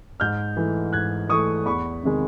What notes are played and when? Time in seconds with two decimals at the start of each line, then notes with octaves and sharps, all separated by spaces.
0.20 G#2 F6 G6
0.57 E3 A3
0.93 G#2 F#6 G#6
1.29 E3 A3 C#6 D#6
1.66 E2 B5 C#6
2.03 C3 D#3 G#3